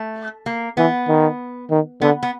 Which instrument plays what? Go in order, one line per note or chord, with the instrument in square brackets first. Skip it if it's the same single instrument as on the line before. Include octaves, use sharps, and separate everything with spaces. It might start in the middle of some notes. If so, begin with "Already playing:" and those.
Already playing: [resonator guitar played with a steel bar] A3
A#3
[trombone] E3 [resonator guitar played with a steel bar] B3
[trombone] D#3
D#3
[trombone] D3 [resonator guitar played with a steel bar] B3
[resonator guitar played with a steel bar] B3